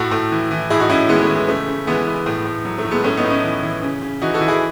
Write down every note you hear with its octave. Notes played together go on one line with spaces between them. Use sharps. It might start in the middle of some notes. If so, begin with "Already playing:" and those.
Already playing: A2 F#4 A4
A2
E3
E3
A2 E4 G#4
D#4 F#4
A2 C#4 E4
E3 G#3 B3
A3
E3
G#3
C#3 A3
C#3
E3 G#3 B3
E3
A2
A2
F#3
A3
F#3
G#3 B3
A2 A3 C#4
B3 D#4
A2
C#4 E4
E3
E3
C#3
C#3
E3 D#4 F#4
F#4 A4
E3
E4 G#4